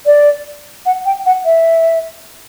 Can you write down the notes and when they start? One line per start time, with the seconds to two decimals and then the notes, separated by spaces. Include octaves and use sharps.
0.06 D5
0.86 F#5
1.05 G5
1.26 F#5
1.45 E5